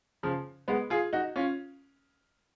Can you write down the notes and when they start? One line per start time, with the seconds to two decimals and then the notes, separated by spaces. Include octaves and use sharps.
0.23 C#3 F3
0.68 G#3 B3
0.90 F4 G#4
1.13 D#4 F#4
1.36 C#4 F4